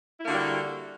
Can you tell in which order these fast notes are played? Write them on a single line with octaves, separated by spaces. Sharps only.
E4 A#3 D3 F#4 G3